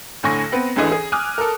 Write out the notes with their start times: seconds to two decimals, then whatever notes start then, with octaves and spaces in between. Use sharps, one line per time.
0.23 D2 A2 D3 G#5 C#6 A#6
0.52 B3 C4 B4
0.76 A1 D2 D3 E3 G#4 D#5
0.92 G#4
1.12 G#5 D6 D#6 F6 F#6
1.38 A4 A#4